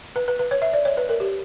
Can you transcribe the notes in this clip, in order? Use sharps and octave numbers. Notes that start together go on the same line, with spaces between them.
B4
B4
B4
C#5
E5
D5
C#5
B4
A#4
G4